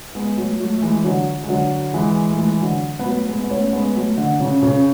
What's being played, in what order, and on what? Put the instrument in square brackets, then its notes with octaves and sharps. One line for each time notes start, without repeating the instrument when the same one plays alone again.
[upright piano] G#3 B3
F#3 A3
F#3 A3
A3
E3 G#3
D3 F#3
G#3
D3 F#3
E3 G#3
A3
E3 G#3
D3 F#3
B3
F#3 A3
G#3 B3
B3
A3 C#4
G#3 B3
F#3 A3
D3
C#3
C#3